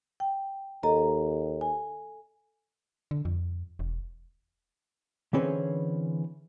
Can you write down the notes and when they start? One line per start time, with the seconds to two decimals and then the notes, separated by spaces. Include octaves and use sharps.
0.20 G5
0.83 D#2 A4 D#5 A#5
1.61 G#5
3.11 D3
3.25 F2
3.79 E1
5.33 D3 E3 C4 C#4 G#4 B4